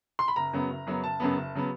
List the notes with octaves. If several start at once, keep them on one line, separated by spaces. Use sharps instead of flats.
C6
B5
F#1 A#5
F#2 C#3 F#3 B3
F#1
F#2 C#3 F#3 B3
F#1 A5
F#2 C#3 F#3 B3
F#1
C#3 F#3 B3